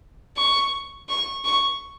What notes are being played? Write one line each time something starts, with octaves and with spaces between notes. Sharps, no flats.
C#6
C#6
C#6